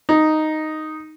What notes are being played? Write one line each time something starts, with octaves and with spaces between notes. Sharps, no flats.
D#4